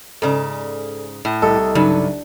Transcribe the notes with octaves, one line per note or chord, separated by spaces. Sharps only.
G#2 C#3 A4 D5
A2
C2 A4 D#5 D#6
G2 C#3 F#3 D#4